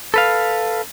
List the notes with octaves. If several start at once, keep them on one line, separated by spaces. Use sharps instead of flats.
A4 B4 F5